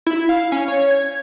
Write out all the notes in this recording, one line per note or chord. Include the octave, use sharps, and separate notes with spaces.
E4
F5
C#4
C#5
G#6